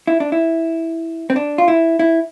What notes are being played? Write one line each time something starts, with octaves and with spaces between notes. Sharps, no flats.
E4
D4
E4
C4
D4
F4
E4
E4